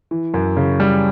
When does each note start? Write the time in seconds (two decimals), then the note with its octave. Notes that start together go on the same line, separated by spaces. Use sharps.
0.11 E3
0.34 F#2
0.57 C#3
0.80 G3